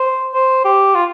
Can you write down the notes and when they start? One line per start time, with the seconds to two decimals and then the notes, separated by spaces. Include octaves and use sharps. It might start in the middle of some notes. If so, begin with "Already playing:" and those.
Already playing: C5
0.34 C5
0.65 G4
0.95 F4